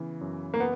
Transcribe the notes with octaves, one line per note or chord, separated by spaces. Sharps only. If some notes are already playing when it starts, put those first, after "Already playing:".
Already playing: C#3 E3 B3
F#2
A#3
B3